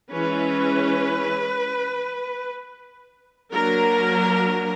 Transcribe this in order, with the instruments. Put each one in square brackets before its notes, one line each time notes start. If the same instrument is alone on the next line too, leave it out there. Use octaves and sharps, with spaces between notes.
[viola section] E3 G#3 C#4 B4
F#3 A#3 D4 A#4